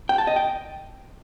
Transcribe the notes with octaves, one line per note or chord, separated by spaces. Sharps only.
G5
A5
D#5
G5